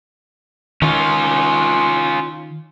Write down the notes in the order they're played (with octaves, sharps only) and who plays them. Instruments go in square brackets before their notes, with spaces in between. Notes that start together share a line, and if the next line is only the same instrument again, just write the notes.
[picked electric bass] D#3 [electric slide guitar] C#4 F4